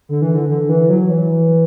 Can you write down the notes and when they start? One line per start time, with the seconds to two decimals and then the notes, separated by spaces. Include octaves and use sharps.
0.09 D3
0.22 E3
0.35 D3
0.49 D3
0.69 E3
0.89 F#3
1.10 E3